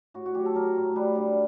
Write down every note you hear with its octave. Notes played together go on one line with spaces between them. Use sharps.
A2 F#4
F#4
F#3 G4
A4
F#3 A#4
A2
G3 B4
D3